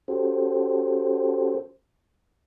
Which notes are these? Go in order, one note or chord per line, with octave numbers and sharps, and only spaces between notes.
C#4 F#4 G4 A4 C5